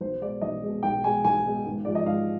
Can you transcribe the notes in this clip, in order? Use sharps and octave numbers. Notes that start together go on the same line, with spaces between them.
B1 C5
B2 G#3 D5
B1 D#5
B2 G#3
B1 G5
B2 G#3 G#5
B1 G#5
B2 G#3
G#1
G#2 F3 G#3 D5
D#5
G#1 F5